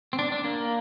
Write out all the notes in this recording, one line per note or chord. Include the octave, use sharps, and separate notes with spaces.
C4
D4
D4
A#3